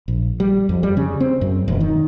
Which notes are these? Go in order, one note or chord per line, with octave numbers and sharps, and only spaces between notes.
A#1
G3
F2
G3
C#3
C4
F#2
E1
D#3